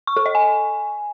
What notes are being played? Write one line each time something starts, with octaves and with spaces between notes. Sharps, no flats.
C#6
A4
D#5
G#5